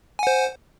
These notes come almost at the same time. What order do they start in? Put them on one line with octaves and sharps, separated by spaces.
G#5 F#5 C5